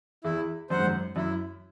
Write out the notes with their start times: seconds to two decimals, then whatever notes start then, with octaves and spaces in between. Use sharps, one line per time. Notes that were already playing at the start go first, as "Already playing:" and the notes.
0.24 E2 E4
0.70 F#2 C5 F#5
0.79 G#2
0.86 F#2
1.16 F#2 E4